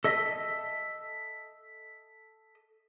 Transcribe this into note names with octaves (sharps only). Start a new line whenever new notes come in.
A4 D#5 E5